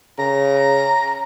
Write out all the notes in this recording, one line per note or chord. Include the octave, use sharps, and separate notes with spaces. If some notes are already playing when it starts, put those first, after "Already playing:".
C#3 A#5